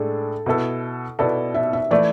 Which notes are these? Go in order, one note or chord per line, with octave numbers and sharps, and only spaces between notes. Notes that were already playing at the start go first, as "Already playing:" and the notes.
Already playing: A2 G#3 D4 G#4 A4
B2 B3 E4 A4
B2 B3 E4 A4 D5
E5
E5
E3 A3 E4 D5